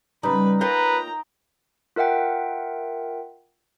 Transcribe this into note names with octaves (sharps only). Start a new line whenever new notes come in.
C#3 G3 D#4 B4 B5
F4 A#4 B4 C#5 G5 A#5
F4 A#4 E5 F#5 G5